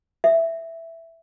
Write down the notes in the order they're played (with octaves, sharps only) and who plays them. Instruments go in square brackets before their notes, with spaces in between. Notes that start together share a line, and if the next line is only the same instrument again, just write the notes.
[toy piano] E5